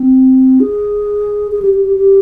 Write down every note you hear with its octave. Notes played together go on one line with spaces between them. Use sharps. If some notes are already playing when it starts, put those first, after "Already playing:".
Already playing: C4
G#4
G#4
G4
G4
G4
G4